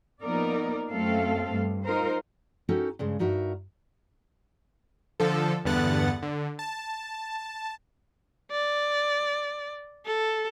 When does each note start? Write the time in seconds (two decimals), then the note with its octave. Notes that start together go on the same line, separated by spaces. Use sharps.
0.21 F3 A#3 B3 D#4 A#4 D5
0.90 F#2 A3 C4 A4 F5
1.51 G2
1.85 D#4 F4 A#4 C5
2.69 C#4 D#4 F#4 G4 A4 A#4
2.99 G2 C#3 G#3
3.19 G2 D#4 F#4 A#4 E5
5.20 D3 F3 A4
5.65 E2 G2 D3 B3 F#5 A6
6.23 D3
6.59 A5
8.51 D5
10.05 A4